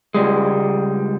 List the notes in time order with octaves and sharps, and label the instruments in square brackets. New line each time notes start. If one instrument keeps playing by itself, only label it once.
[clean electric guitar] C#2 G3 G#3